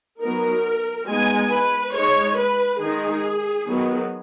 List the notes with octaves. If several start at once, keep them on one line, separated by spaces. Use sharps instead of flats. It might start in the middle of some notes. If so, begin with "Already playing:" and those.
F#3 B3 D#4 A#4
G#3 B3 D#4 G#5
B4
G#3 D#4 C#5
B4
D#3 G#3 D#4 G#4
D#3 F#3 B3